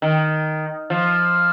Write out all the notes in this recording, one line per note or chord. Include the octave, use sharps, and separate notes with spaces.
D#3
F3